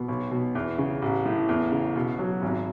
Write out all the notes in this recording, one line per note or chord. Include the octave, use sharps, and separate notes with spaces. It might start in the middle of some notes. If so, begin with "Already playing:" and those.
Already playing: B2
B1
B2
E2
C#3
A1
A2
E2
C#3
B2
F#3
G#1